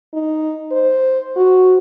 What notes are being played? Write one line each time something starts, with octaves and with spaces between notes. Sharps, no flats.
D#4
C5
F#4